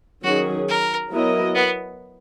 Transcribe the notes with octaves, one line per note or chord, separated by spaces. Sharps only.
D#3 F#3 C#4 F#4 G#4
A#4
F#3 B3 E4 A#4 D#5
B3